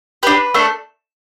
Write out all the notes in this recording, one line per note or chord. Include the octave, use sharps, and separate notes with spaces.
D4 G4 B4
A3 D4 A4